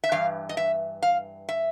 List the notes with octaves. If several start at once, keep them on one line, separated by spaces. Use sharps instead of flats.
E5
G2 E3 F5
D#5
E5
F5
E5